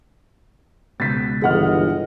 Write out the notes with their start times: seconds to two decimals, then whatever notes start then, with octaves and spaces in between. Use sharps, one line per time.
1.00 C#2 B2 A6 B6
1.42 G1 E3 G#3 D#5 F#5 F6